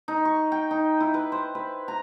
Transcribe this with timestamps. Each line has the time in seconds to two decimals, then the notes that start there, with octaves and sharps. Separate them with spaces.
0.08 D#4
0.25 C#6
0.52 G5
0.71 D#4
1.00 E4
1.14 B4
1.32 C5
1.55 B4
1.88 A#5